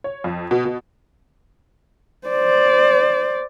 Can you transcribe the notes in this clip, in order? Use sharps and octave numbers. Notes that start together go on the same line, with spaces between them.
C#5
F2
B2
B2
C5 D5